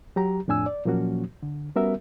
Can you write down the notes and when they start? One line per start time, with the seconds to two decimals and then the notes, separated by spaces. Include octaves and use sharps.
0.16 F#3 G4 A#5
0.48 F2 A2 D4 G#5 E6
0.66 D5
0.85 A#2 F3 F#3 A#3 C#4 F#4
1.43 D3
1.76 G3 B3 C#4 F#4 A#4 E5